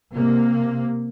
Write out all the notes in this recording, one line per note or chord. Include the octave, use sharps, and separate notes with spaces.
C3 A#3